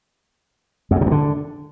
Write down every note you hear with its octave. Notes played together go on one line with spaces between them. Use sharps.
F#2
A2
C3
G2
D3